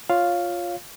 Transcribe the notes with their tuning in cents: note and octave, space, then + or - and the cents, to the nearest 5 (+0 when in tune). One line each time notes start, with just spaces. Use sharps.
F4 +5 C#5 +0 F5 +0